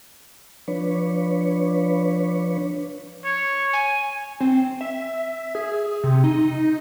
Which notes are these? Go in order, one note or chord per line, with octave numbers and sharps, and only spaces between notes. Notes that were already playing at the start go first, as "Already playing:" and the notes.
F3 D4 B4 C#5
C#5
G#5
C4
E5
G#4
C3
D#4